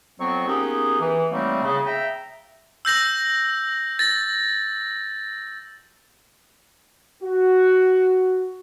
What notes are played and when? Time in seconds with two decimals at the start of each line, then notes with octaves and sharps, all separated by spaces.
0.19 F2 F#3 B3 C4 C#6
0.47 A#3 B3 C#4 D#4 G4 G#4
1.00 E3
1.31 F#3 G3 A3 A#3 C4 D#4
1.63 C#3
1.86 E5 G5 A#5
2.85 E6 G6 A#6 F#7
3.99 A6 A#6
7.23 F#4